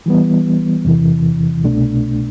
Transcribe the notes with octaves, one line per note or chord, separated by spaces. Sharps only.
E3 G3 B3
E2 C3 E3
C2 B2 A3 D4